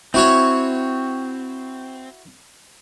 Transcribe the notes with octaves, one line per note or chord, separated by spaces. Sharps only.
C4 E4 F#4 C#5